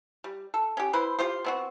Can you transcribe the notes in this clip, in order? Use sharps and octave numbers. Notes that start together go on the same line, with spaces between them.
G3
A4
C#4 G4
E4 B4 C5
F4 G4 C5
B3 C4 F#4